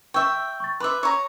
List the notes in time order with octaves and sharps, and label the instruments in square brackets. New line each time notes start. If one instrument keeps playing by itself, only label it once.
[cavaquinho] E5 G5 [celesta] C#6 E6
[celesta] C#6 A6
[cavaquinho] B4 E5 [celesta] C6 D6
[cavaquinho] C#5 A#5